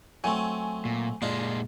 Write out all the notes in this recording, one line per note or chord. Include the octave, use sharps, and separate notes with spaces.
F#3 A3 C4 G#5
A#2
A#2 G#3 D4 D#4 F4